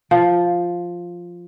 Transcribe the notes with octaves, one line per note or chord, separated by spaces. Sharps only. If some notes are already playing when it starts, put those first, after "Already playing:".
F3